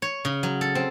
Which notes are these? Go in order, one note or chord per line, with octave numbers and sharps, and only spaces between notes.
C#5
C#3
F#3
A4
C4